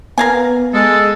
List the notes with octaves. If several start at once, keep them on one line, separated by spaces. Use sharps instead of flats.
B3 A#4 F5 G#5
G#3 A4